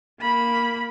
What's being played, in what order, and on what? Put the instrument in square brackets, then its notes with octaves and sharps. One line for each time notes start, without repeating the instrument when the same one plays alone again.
[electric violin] A#3 B5